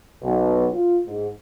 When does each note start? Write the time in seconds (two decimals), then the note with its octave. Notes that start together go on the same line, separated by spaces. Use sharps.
0.23 B1
0.74 F4
1.07 G#2